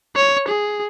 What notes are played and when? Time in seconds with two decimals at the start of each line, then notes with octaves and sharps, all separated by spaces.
0.16 C#5
0.48 G#4